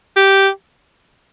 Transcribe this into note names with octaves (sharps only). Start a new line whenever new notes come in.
G4